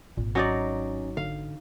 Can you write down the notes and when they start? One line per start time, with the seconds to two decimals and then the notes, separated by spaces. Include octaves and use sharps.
0.17 G#1 A#2
0.35 F#3 C#4 D#4 D5
1.17 D3 F5